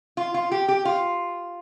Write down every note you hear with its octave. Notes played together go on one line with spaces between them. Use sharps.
F4
F4
G4
G4
F4